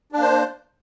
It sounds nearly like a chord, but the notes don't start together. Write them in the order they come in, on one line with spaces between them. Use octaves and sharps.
D4 A#3 C5